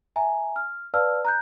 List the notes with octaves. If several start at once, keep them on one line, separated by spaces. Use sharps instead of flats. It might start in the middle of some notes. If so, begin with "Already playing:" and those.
E5 G#5 A#5
F6
B4 D5 F5 A5 E6 F6
A#5 F#6 G6